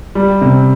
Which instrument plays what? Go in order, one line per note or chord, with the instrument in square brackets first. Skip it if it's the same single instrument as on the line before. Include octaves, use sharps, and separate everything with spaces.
[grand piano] G3
C3